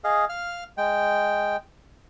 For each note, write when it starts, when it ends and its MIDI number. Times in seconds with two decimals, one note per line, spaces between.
0.04 0.25 68
0.04 0.25 75
0.04 0.25 77
0.29 0.64 77
0.29 0.64 89
0.78 1.56 56
0.78 1.56 79